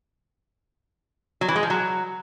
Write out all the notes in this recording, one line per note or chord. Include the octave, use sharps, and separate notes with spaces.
F#3
E3
G#3
F3
F#3